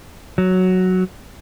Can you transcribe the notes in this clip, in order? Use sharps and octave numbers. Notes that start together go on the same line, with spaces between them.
F#3